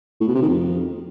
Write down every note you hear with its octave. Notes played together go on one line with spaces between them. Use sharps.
A2
B2
C3
D#3
F2